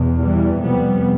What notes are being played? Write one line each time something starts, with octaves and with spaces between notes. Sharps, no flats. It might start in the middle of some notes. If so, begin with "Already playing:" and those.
Already playing: E2 B2
E3 G3
F2 C3 G3 B3